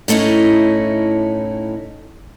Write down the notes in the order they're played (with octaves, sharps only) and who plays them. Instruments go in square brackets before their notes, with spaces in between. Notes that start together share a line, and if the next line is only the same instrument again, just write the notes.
[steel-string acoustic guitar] A2 A3 C#4 D#4 E4